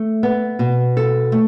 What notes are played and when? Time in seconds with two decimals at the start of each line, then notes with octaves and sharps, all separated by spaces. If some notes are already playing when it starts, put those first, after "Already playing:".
Already playing: A3
0.23 B3
0.59 B2
0.97 A4
1.32 A3